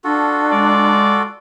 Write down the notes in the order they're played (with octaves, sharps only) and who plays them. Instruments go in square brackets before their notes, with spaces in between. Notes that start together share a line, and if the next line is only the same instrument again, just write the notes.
[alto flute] D4 [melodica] F4 F#4 A4
[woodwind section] G#3 D5